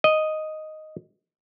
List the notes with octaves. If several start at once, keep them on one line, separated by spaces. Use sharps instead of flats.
D#5